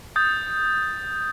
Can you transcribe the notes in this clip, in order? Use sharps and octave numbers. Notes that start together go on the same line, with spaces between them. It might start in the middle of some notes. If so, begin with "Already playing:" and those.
D#6 G6 A6